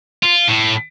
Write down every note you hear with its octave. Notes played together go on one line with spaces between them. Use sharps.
F4
A2